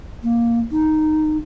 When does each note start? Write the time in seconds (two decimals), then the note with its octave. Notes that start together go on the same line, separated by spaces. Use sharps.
0.24 A#3
0.72 D#4